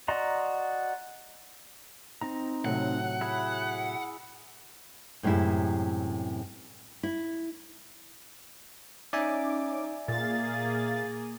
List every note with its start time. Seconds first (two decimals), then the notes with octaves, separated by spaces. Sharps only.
0.08 F#4 D5 D#5 A#5 C6
2.21 C4 D#4 A#5
2.65 A2 C3 F#3 F#5
3.21 E4 G#4 B5
5.23 F#2 A2 C3 G#3 E4
7.03 E4
9.13 C#4 D#4 D5 E5 G#5 D6
10.08 A#2 A#3 G#4 F5 A6